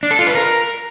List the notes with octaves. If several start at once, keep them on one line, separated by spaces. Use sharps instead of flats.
D4
A4
F4
B4
A#4